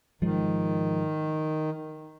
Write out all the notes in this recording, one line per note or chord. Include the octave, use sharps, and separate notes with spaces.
G#2 D#3 F3 G#3